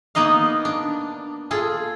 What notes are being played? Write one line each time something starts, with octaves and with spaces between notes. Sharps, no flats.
A#3 B3 D#4 D#5 F5
D4
F4 G#4 A4